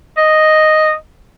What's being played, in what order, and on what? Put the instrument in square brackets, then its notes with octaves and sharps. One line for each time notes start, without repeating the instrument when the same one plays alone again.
[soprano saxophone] D#5